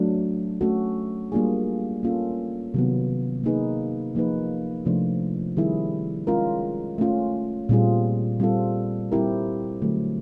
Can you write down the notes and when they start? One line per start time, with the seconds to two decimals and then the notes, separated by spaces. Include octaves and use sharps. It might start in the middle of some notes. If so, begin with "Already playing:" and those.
Already playing: F#3 A3 D4
0.61 A3 C#4 F#4 A4
1.32 G3 A#3 D4 F4 G#4
2.03 A#3 C#4 F4 A4
2.74 C3 D#3 F#3 B3
3.44 A#3 D#4 G#4 B4
4.15 F3 A#3 D#4 G#4 B4
4.85 C3 F3 A3 D4 F4
5.57 D#3 G3 C4 E4 G#4
6.27 G#3 C#4 F4 A#4
6.98 A3 C#4 F4
7.69 A#2 G3 C4 F4 G#4
8.40 G3 C4 F4 A4
9.12 G3 C4 E4 G4 A#4
9.82 D3 F#3 A3